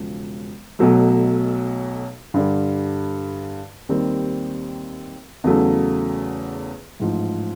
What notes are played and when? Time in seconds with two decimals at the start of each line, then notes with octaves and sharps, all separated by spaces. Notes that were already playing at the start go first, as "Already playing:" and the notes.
Already playing: E1 C#3 F3
0.79 B1 B2 F#3 A3
2.34 G2 D3 G3
3.89 D#2 D#3 G3 C4
5.44 E2 C#3 F#3 A3
6.99 A1 G#2 F3